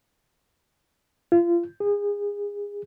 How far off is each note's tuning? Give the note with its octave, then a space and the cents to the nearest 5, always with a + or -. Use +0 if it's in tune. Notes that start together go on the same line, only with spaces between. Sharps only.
F4 -30
G#4 -30